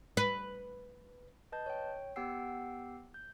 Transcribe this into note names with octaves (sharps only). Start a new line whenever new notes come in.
B4
B4 D#5 A5 G6
C#5 G5
B3 G4 F#5 G5 E6 C7
G6